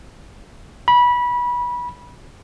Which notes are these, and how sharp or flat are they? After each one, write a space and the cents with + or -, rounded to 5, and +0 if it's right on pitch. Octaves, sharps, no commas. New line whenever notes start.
B5 -20